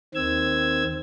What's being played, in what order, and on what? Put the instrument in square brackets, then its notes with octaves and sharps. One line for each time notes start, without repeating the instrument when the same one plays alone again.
[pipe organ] D#2 D#3 C4 E6 G#6